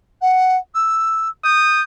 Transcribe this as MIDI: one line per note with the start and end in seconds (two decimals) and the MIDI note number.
0.21 0.56 78
0.74 1.29 88
1.44 1.81 87
1.44 1.83 91